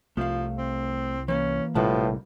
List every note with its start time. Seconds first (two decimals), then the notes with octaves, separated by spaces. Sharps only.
0.17 C2 F3 A3 F5
0.58 C4
1.28 E3 A#3 C#4
1.75 A#1 A2 C3 F3 G3 B4 F#5 A5